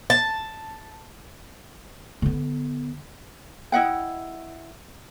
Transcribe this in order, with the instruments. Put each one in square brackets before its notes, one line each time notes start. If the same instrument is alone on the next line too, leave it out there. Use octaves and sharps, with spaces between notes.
[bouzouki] A5
[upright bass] D3 B3
[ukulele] E4 D#5 F#5 G5